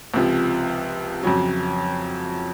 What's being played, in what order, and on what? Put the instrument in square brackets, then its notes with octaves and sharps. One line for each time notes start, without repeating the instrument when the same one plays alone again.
[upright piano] C#2 C3 F3
F2 C#3 F#3